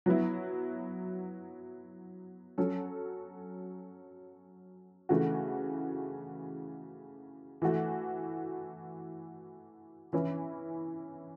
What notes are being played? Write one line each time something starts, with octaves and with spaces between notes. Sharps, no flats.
F#3 B3 E4
F#3 C#4 A4
C#3 E3 A3 F#4
E3 A3 F#4
E3 C#4 E4 B4